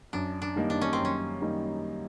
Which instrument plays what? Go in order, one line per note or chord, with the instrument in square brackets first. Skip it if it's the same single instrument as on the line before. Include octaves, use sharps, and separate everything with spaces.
[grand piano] F#2 [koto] D4
[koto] D4
[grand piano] D#3 G3 A#3 D#4
[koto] D4
C#4
C4
[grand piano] F#2
[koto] C#4
[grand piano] D#3 G3 A#3 D#4